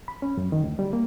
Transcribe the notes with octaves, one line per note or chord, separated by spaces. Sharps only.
B5
C#4
F#2
D#3
D2
G3
A#3